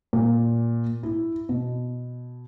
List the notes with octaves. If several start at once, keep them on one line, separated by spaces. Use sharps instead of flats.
A#2
E4
B2